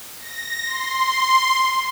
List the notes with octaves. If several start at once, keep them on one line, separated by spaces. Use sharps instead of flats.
A#6
C6